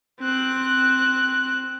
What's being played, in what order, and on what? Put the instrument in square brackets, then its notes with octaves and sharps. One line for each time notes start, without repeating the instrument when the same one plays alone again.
[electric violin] C4 F#6